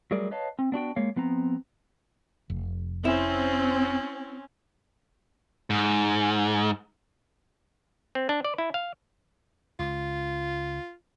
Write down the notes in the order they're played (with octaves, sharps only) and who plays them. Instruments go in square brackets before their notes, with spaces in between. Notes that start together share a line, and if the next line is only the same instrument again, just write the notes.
[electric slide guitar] F#3 G3 A3 G#4 A#4 D5
B4 C#5 D#5 F5 A5
C4
B3 D4 F#4 G5
G#3 A#3 C#5 F5
F3 B3 C4 A#5
[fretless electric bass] F1
[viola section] C4 [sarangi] C#4 [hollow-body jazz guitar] E4
[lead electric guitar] G#2
[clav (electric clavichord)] C4
D4
D5
E4
F5
[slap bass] C#2 [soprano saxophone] F4